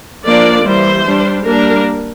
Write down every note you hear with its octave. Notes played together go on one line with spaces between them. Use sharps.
F3 A#3 D4 D5
E3 G3 A#3 C5
G3 D4
G3 A#3 D4 A#4